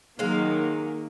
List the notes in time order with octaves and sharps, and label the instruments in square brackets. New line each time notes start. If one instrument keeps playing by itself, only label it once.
[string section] D#3 F#3 A#3 [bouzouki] G#3 F5